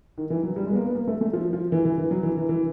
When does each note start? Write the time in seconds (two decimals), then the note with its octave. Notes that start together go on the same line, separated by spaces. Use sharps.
0.18 D#3
0.30 E3
0.43 F#3
0.56 G3
0.66 G#3
0.71 B3
0.75 A#3
0.86 B3
0.95 A#3
1.08 A3
1.21 A3
1.33 F3
1.53 F3
1.72 E3
1.85 E3
1.98 E3
2.11 F#3
2.23 E3
2.37 E3
2.49 E3